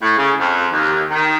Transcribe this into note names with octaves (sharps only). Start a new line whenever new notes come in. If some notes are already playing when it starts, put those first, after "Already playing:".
A2
C#3
F2
D#2
D#3